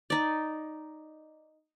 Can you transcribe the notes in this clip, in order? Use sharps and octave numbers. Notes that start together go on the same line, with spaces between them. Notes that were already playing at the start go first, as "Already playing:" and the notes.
D#4 D5